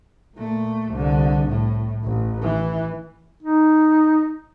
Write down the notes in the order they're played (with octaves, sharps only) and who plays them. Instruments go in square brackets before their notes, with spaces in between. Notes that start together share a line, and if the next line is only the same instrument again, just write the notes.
[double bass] A#2 A3
C2 D3
A2
A1
E3
[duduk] D#4